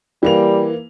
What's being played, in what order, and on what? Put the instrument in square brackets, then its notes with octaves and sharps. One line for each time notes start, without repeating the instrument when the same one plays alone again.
[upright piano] E3 A#3 F7 [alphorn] G3